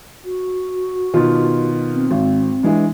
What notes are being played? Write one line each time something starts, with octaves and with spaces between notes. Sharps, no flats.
F#4
B2 D#3 F4
C4
G#1
E3 G#3 D4